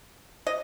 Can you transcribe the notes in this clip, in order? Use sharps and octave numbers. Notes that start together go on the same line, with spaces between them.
D#5